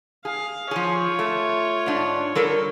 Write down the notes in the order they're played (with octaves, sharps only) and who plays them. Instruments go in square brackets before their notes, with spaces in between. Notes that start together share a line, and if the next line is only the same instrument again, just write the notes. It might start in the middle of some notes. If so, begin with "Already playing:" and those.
[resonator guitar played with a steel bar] G#4 [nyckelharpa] F5
[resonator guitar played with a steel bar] F3 G#4 [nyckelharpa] F4 C#5
[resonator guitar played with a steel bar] A3
G#2 D4
G3 A4 A#4